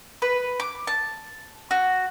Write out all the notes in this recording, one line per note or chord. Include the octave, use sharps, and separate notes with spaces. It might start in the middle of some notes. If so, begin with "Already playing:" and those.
B4
D6
A5
F#4